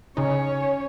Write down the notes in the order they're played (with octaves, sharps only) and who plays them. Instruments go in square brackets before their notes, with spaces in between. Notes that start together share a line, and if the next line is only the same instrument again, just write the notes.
[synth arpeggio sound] C#3 D#4 [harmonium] C#4 [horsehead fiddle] C#5